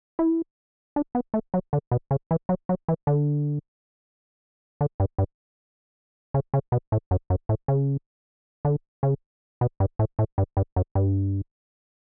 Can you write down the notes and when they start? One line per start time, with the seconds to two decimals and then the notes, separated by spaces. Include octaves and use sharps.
0.19 E4
0.96 D4
1.15 B3
1.34 A3
1.54 F#3
1.73 D3
1.91 B2
2.11 C#3
2.31 E3
2.49 F#3
2.69 F#3
2.88 E3
3.07 D3
4.81 D3
5.00 G2
5.18 G2
6.34 C#3
6.54 C#3
6.72 B2
6.92 A2
7.11 F#2
7.30 F#2
7.49 A2
7.68 C#3
8.65 D3
9.03 C#3
9.61 B2
9.80 G2
9.99 A2
10.19 A2
10.38 G2
10.57 G2
10.76 F#2
10.95 G2